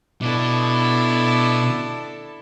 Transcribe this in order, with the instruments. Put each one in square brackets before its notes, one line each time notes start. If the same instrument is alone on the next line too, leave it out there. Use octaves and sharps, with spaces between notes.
[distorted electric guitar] B2 [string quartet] D4 E4 A4